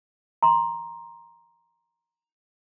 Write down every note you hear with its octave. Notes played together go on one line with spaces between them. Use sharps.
A#5 C6